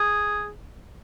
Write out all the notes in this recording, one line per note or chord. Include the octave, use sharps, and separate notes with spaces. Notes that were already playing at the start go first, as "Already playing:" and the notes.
Already playing: G#4